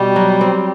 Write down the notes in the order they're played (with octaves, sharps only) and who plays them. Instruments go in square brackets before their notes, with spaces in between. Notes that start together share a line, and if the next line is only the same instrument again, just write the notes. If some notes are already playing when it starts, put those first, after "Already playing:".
Already playing: [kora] B2 G4 [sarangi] G3
[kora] F#3
C4